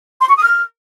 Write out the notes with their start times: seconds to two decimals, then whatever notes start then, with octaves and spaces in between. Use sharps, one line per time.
0.20 C6
0.28 C#6
0.36 D#6
0.43 F6